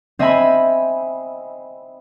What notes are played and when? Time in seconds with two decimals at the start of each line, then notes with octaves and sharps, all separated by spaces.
0.19 C4 D#5 E5 G5 G#5 B5